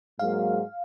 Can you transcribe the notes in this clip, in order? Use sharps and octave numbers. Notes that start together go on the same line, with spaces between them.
G#2 F#3 A#3 F5